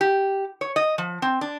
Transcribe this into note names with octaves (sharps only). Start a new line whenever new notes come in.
G4
C#5
D#5
F3
C4
D4